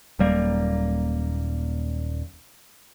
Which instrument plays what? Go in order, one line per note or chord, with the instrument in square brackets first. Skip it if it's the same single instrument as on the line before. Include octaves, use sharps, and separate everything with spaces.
[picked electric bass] D#1 F#3 G3 A#3